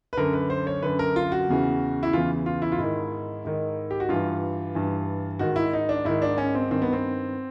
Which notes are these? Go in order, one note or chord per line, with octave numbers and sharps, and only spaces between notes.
B4
F#2 D3 A#4
B4
C5
C#5
F#2 D3 B4
A#4
F4
F#4
E2 C#3 E3
E4
E2 C#3 E3 F4
F4
E4
F4
G#2 D#3 E4
G#2 D#3
G4
F#4
G2 E3 F4
G2 E3
G#2 D#3 F#4
E4
D#4
D4
G#2 D#3 E4
D4
C#4
C4
G2 D#3 C4
B3
C4